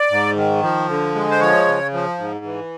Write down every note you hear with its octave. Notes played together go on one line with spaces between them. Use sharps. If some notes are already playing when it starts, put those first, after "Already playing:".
Already playing: D5
G#2
D#3
F3
D3
G#3
C5
F3 C#5
C#3
F3
G#2
E3